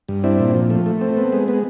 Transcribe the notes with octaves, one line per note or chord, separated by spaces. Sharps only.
G2
C4 D4 E4
A#2
F3
A3
A3
C4
B3
G#3
B3